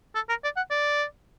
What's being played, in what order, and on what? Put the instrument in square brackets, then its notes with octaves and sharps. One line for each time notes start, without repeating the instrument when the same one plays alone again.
[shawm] A4
A#4
D5
F#5
D5